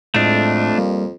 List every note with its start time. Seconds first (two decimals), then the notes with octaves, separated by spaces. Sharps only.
0.14 F2 A2 G#3 A3 D4 D#5
0.78 G3 A#3